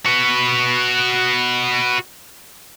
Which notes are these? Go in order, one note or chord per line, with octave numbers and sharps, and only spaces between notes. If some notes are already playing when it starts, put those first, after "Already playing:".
F#4 B4